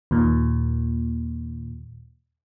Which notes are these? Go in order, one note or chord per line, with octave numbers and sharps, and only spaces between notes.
D#2 A#2